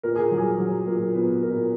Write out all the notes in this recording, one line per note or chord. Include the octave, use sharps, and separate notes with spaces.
A#2 A#4
G#4
F#3
G#4
F#3
A#2 A#4
A#2 B3 B4
A#2 A#4